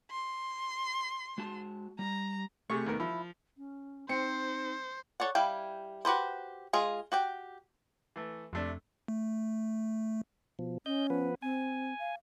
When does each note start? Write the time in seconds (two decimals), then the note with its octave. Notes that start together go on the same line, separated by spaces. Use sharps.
0.11 C6
1.38 G#3 F#4 A5
1.99 G3 A#5
2.70 C3 A3 G#4 C#6
2.86 D#2 B3 A#4
3.00 F3 E4
3.57 C#4
4.09 C4 D#4 C5 C#7
5.20 A4 C#5 D5 F#5
5.35 G3 E4 F5 G5
6.05 F#4 G4 B4 C5
6.73 G#3 F4 G#4
7.12 F#4 G4 G5
8.16 E3 A3
8.53 F2 C3 A3 D4
9.08 A3
10.59 B2 F3
10.86 C#4 D#5 G6
11.10 F3 B3 B4
11.42 C4 G#5
11.99 F5